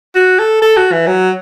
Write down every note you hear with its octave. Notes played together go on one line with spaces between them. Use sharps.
F#4
A4
A4
F#4
E3
F#3